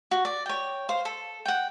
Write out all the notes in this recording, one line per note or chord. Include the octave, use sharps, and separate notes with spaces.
F#4
D5
C#5 G5
C5 F5
A4
F#5 G5